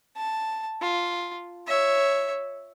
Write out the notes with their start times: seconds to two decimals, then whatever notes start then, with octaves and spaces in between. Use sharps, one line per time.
0.17 A5
0.82 F4
1.67 C#5 E5